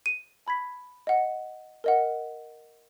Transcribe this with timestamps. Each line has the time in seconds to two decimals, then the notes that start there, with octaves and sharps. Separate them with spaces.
0.06 D#7
0.47 A5 B5 G#6 B6
1.07 D#5 F#5
1.84 A#4 D#5 F#5